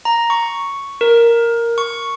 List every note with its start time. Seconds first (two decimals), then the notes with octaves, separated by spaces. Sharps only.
0.05 A#5
0.30 C#6
1.01 A#4
1.78 C#6